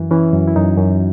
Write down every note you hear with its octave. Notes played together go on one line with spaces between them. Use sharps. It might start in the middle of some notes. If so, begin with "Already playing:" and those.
Already playing: F#2 E3
E3 C#4
F#2
E4
F#2 D#4
F#2